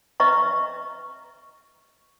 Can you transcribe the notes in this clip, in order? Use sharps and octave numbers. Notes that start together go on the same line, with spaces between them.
B4 D#5 E5 A#5 C#6